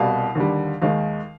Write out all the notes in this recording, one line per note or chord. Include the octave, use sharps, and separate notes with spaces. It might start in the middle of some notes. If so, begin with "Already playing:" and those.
Already playing: C2 B2 G3 F5
D#2 D3 G3
D#2 D#3 G#3 F5